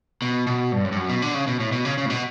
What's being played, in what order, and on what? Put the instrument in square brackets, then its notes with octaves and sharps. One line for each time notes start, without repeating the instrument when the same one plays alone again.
[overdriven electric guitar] B2
B2
G2
F#2
G2
F#2
B2
D3
C#3
B2
A2
B2
C#3
C#3
A2
B2